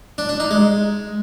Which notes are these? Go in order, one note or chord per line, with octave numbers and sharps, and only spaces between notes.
D4
D4
D#4
G#3